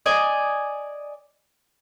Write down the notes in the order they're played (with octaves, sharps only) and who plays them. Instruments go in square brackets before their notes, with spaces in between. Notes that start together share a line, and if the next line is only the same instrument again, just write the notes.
[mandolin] D5 D#5 G#5